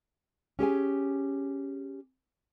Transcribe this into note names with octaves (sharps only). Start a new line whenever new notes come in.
C#4 G4 G#4 G#5